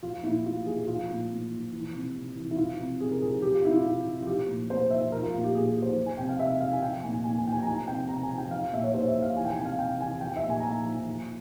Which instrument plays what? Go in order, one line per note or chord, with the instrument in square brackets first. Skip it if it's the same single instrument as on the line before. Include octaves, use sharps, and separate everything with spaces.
[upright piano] F3 F4
A#2 E4
A#2 F4
F3 G#4
F3 F4
A#2
A#2
F3
E3
C3
C3
E3
E4
F3 F4
C3
C3 G#4
A#4
F3 G#4
F3 G4
F4
C3 E4
F4
C3
F3
F4
F3 G4
A#2
A#2 C5
F3 E5
F3 A#4
F4
A#2 F4
G4
A#2 G#4
G4
F3
C5
F3
G#5
C3 G5
F5
C3 E5
F3 F5
G#5
F3 G5
A#2 G#5
A#2 G#5
G#5
F3 G5
G#5
A#5
F3 G#5
C3 G5
C3 A#5
G#5
F3
G5
F3 F5
A#2 E5
C#5
A#2 C5
E5
F3
F5
E3 G#5
G5
G#5
C3
F5
C3 G5
E3 G#5
F3 G5
E5
A#2
G#5
A#5
A#2 G#5
F3
F3